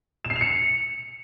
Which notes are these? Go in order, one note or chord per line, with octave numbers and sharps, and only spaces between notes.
E7
C7
F7
C#7